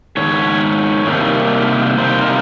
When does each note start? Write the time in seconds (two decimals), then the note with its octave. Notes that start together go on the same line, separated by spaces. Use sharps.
0.17 G#2 D#3 C#5
1.07 C3 D#3 G3 A#3
1.98 C3 D#3 G3 A#3 C5
2.21 A#4